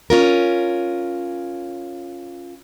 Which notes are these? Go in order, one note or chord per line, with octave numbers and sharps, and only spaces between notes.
C#4 F4 A#4